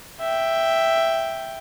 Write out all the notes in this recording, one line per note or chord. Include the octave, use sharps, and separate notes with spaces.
E5 G5